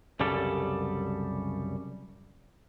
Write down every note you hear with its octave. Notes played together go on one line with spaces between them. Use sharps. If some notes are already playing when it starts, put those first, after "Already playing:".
C2 F#2 C#3 G3 A4